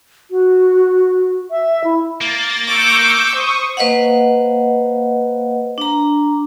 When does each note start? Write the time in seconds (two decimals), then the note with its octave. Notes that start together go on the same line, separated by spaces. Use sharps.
0.31 F#4
1.51 E5
1.84 E4
2.21 A#3 A6
2.67 C#6 D6 E6 G6
3.35 C5 C#6 D#6
3.77 A#3 B4 C5 D#5 F5 F#5
5.78 D4 A#5